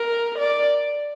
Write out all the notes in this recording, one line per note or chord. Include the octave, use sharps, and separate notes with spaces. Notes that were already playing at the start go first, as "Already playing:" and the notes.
Already playing: A#4
D5